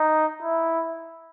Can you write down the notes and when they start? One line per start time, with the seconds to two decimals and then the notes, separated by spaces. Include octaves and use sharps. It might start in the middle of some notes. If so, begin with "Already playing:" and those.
Already playing: D#4
0.42 E4